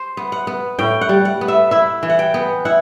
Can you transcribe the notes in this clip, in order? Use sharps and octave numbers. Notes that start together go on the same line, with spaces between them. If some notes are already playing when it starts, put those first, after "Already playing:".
Already playing: C5
B3
F#5
B3
A2 G5
F#5
G3
F#5
B3
E5
E4 E5
E3
F#5
G5
B3
E4 F#5